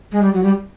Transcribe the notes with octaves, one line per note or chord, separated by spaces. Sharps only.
G#3
G3
F#3
G3